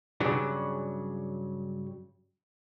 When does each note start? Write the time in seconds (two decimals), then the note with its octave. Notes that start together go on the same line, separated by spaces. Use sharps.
0.20 G2 C#3 F#3 D4